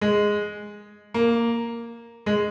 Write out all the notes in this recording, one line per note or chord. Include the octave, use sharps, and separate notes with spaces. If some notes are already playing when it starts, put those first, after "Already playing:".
G#3
A#3
G#3